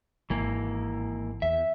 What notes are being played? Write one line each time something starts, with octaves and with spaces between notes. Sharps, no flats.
G#1 E3 A#3
E2 E5